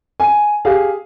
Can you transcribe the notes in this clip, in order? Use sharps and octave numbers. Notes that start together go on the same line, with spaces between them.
G#5
G4 G#4 F5